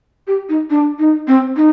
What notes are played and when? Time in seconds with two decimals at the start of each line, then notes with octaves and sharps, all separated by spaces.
0.27 G4
0.49 D#4
0.70 D4
0.99 D#4
1.28 C4
1.57 D#4